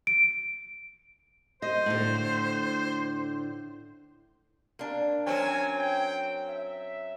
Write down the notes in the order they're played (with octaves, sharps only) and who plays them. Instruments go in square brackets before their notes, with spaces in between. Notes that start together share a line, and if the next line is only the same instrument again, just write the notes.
[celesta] D7
[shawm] C5 [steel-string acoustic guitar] D#5
[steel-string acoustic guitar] A2 D3
[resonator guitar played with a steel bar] A#3 D4
[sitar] F#3 C4 C#4 [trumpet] G#5
[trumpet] G5
E5